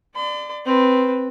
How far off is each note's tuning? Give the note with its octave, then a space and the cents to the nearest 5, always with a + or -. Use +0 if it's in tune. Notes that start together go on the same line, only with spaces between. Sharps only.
D5 +20 C6 -45
C4 +0 B4 +0